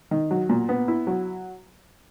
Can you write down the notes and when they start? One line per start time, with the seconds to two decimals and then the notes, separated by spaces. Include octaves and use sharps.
0.11 D#3
0.31 F#3
0.49 A#2
0.69 B3
0.88 E4
1.07 F#3